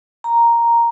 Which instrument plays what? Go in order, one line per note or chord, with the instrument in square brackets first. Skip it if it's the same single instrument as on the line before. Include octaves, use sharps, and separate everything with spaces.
[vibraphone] A#5